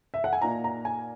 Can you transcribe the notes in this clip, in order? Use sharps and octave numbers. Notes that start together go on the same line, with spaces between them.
E5
F#5
G#5
A#2 A#3 D#4 A#5
A#5
G#5